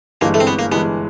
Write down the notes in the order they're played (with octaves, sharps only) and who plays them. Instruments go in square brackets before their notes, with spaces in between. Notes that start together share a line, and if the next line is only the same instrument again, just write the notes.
[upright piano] G1 G2 E3 G#3 [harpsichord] A#3
[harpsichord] A3
C4
B3
A#3
[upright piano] G1 G2 E3 G#3 [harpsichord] B3